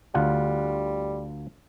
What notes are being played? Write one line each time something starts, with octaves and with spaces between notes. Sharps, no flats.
D2 G3 F4 F#5